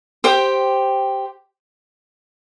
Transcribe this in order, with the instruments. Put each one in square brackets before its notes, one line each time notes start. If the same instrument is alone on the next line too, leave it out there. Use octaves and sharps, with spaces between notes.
[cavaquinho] G4 C5 G5 D6